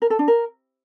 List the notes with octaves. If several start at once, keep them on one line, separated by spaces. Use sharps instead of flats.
A#4
A4
D4
A#4